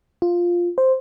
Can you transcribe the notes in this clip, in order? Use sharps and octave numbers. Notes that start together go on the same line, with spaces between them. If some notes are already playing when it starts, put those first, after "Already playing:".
F4
C5